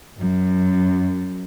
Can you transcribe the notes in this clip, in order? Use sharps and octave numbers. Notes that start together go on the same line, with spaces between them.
F#2